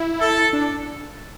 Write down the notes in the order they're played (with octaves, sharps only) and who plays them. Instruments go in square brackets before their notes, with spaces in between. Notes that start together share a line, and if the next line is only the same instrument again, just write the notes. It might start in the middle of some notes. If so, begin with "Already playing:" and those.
Already playing: [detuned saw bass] E4
[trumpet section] A4
[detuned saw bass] D4